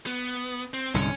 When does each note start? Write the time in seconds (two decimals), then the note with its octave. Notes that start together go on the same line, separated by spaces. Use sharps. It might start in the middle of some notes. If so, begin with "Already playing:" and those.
0.07 B3
0.74 C4
0.94 C2 G#2 D3 C#4